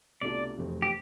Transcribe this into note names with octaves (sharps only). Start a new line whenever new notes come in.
C2 B2 A3 D4 F4 D5
F1 E2 B2 A3 C4
G4